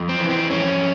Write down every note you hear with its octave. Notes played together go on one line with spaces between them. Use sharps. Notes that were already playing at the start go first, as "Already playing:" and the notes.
Already playing: F2
C4
E3
C4
F2 C#4